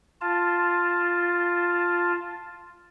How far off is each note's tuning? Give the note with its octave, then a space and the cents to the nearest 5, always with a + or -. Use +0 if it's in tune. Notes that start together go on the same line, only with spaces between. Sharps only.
F4 +0 A5 +0